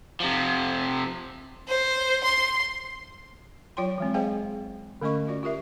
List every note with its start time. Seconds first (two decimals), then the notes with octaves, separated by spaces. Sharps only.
0.20 C3 F3
1.68 C5
2.24 C6
3.77 F#3 F4 C#5 G5 C6
3.98 E3 G#3 C4
4.14 G#4 C5 D#5 F5 G5 G#5
5.01 D3 A3 C#4 D#5 C#6
5.27 F4 F#4 D5
5.43 F4 G4 A#4 E5